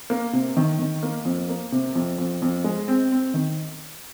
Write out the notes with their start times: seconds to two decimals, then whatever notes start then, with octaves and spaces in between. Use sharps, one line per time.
0.10 A#3
0.33 C3
0.57 D#3
0.79 D#3
1.03 A#3
1.25 F2
1.49 A#3
1.72 C3
1.95 F2
2.18 F2
2.42 F2
2.64 G#3
2.88 C4
3.12 C4
3.34 D#3